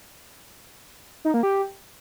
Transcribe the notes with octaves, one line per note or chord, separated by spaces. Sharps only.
D#4
A#3
G4